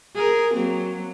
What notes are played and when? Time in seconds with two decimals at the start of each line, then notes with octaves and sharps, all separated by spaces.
0.16 G#4 A#4
0.54 F#3 A#3 C4